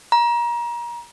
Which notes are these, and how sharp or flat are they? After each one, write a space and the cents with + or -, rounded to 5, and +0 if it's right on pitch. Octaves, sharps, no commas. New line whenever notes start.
A#5 +30